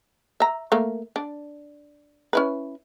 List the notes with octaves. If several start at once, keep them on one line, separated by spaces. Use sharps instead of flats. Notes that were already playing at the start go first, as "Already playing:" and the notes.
E5 A#5
A3 A#3
D4
C#4 E4 B4